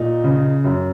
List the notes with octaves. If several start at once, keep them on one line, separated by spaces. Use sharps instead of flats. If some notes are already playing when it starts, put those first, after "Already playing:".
Already playing: A#2 D#4
C#3
F#2